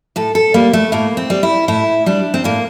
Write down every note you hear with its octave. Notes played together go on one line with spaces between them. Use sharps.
A2 A4
A4
G3 A#3
A3
A2 A#3
C4
G3
E4
A2 E4
G3 D4
C4
A2 A#3